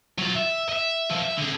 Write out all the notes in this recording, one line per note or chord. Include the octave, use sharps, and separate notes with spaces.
F#3 F4
E5
D#5 E5
E3 F3
E5
D3 G#4